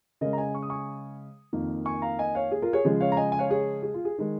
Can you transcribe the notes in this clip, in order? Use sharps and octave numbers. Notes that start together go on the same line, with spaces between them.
C#3 G#3 A#4 D#5
A#5
D#5 G#5
C#6
D#6
G#5 C#6
F2 D#3 A#3
G#5 C#6
F5 A#5
D#5 G#5
C#5 F5
G#4
F4 A#4
G#4 C#5
C#3 F3 G#3 G#4
C#5 F5
A#5
D#5 G#5
G#5
C#5 F5
G#4 C#5
G#4
F4
G#4
D#3 G#3